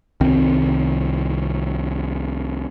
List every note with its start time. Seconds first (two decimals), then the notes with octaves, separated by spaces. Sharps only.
0.21 C2 D#3 C4